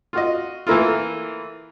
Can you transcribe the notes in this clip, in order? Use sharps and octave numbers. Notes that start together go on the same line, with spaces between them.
F4 F#4 D#5
E3 A3 A#3 E4 F4